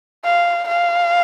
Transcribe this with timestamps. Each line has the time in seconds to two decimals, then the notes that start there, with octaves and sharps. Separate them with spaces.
0.25 F5
0.69 F5